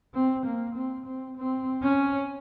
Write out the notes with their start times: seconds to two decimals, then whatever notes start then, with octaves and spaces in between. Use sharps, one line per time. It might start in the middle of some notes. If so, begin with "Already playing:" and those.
0.14 C4
0.45 A#3
0.76 C4
1.06 C4
1.37 C4
1.83 C#4